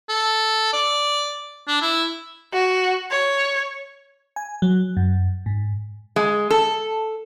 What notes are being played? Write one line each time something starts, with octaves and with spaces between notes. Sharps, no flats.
A4
D5
D4
E4
F#4
C#5
G#5
F#3
F#2
G#2
G#3
A4